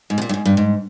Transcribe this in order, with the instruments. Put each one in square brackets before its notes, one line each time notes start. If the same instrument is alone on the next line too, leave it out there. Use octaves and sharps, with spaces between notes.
[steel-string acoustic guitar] G#2
C3
A#2
G2
G#2
G2
G#2